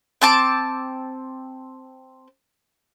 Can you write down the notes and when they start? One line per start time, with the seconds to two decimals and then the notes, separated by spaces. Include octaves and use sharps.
0.22 C4 A5 D6